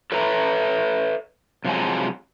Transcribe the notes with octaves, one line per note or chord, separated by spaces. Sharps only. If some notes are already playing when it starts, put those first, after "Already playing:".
A4 B4 C#5 E5 A#5
C3 F3 F#3 G#3 G#5